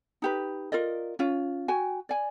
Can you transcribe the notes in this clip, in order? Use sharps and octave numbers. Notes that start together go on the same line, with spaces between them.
D#4 G4 B4
F4 A#4 D5 D#5
C#4 F4
F#4 G5 G#5
D5 G#5